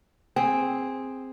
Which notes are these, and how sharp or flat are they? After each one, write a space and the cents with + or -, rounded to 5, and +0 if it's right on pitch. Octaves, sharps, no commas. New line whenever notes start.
C4 +0 G#4 -10